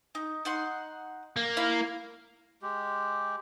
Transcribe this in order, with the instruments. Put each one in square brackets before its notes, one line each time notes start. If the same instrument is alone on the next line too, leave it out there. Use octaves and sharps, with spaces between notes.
[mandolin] D#4
D#4 F#5 C6
[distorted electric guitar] A#3
[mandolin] E4 F5
[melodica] G#3 G4